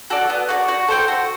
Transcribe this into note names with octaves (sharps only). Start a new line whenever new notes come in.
F#4 A4 D5
B3
F#4 A4 D5
F#4
A4 C5 G5
F#4